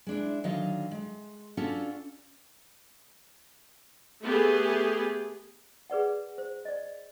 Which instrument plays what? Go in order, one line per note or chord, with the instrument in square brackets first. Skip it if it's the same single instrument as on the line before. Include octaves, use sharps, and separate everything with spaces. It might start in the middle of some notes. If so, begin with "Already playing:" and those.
[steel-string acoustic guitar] G#3 D4 E4
D3 D#3 F#3 D#5 F5
G#3
C#4 D4 F4 F#4 A4
[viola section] A3 B3 G4 G#4
[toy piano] G#4 B4 D5 F#5
C5
D5 D#5